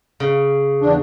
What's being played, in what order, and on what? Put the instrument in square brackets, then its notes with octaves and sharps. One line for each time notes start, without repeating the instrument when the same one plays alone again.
[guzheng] C#3
[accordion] E2 D4